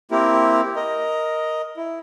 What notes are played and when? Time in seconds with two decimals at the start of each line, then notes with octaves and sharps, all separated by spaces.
0.11 A#3 C4 E4 G4 A#4
0.76 A#4 D#5
1.77 E4